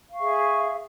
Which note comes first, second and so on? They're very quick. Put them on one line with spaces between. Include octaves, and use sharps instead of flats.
F5 C#6 E5 G#4